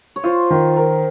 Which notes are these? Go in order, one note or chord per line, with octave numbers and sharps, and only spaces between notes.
C#5
F4 C5
D#3
A#4